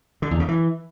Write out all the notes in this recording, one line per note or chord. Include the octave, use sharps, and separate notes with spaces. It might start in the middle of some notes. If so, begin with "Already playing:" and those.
D3
E2
C#3
E3